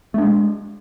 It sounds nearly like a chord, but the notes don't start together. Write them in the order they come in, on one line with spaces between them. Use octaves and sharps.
A3 D4 G#3